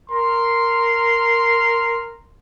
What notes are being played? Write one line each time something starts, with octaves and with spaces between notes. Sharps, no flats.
A#4 C6